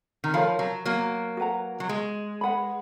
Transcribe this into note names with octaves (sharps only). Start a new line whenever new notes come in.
D#3
F3 A#4 C#5 F5 B5
F#3
F#3 A#3
F#4 B4 F#5 A#5
F#3
G#3
B4 F#5 B5